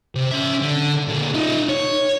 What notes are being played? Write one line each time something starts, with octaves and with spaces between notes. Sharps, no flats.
C3
C#4 E5
D3
A#2 D3
D#4 F4
C#5